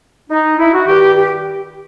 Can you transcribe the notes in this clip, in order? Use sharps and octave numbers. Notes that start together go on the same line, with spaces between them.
D#4
E4
F#4
G2 D#3 G4
G4